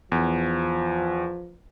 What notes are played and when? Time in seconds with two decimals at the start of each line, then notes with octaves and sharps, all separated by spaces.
0.12 E2 F3